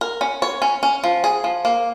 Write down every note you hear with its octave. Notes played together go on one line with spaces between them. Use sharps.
A#4
C#4
C#5
C#4
C#4
F3
G#4
F3
A#3